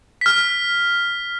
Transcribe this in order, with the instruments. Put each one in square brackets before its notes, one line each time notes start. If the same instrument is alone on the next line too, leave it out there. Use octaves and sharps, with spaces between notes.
[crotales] F6 B6